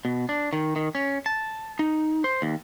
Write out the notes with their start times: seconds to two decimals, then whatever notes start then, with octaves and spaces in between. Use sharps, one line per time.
0.05 B2
0.29 D4
0.53 D#3
0.76 D#3
0.95 C#4
1.26 A5
1.79 D#4
2.24 C5
2.42 D#2